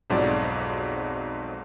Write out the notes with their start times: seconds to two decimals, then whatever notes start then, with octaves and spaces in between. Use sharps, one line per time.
0.10 B1 F2 G#2 F#3 F#4 D5